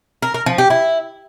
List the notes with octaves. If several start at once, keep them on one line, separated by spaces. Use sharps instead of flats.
A#4
A#4
F3
G4
E4